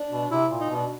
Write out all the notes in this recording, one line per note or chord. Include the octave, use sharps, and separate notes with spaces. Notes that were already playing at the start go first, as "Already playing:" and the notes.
Already playing: D4
B2
C3 E4
A#2
D#4
B2
D4